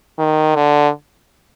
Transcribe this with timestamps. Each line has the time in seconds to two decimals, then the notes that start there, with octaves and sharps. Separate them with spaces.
0.19 D#3
0.55 D3